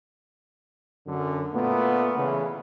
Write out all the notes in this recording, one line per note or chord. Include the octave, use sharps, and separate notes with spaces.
F#2 D3
A#2 A3 B3
C#3 E3